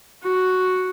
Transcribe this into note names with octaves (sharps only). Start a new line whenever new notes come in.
F#4